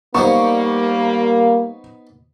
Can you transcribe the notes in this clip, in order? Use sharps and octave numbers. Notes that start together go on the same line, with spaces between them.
G3 A#3 B3 D#4 C5 C#6